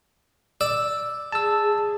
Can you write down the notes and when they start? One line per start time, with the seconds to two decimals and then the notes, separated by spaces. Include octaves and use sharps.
0.61 D5 E6
1.32 G#4 A5 E6